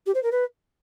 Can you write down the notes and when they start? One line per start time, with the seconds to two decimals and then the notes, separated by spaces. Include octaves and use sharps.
0.06 G4
0.14 C5
0.23 A#4
0.31 B4